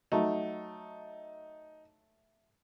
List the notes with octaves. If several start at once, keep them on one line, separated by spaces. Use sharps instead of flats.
F#3 A3 D#4